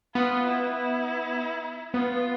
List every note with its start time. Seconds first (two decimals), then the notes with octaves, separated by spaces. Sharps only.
0.15 B3 F4
0.45 E4
0.75 E4
1.94 B3 F4